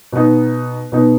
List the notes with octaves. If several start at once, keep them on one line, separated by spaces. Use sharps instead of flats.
B2 B3 D#4
B2 B3 D#4